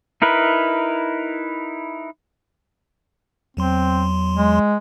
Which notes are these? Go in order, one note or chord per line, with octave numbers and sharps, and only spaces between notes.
D#4 E4 A#4 B4
E2 F#3 C4 C6
G#3